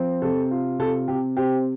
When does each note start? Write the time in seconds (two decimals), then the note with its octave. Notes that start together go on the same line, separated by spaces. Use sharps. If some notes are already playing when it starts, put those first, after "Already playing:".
Already playing: F3 C4
0.22 C3 A4
0.51 F4
0.79 C3 A4
1.08 C3 G4
1.37 C4 G4